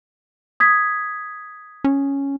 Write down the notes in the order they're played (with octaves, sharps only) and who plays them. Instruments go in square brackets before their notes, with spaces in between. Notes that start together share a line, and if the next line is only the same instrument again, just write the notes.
[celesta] D#6 G#6 B6
[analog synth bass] C#4